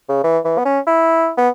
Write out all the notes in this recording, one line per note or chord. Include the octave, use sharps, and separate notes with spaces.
C#3
E3
E3
B3
C#4
E4
B3